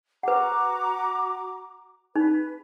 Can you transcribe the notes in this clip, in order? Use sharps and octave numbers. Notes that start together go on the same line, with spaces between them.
F#4 B4 F#5 A#5 D6
D#4 B4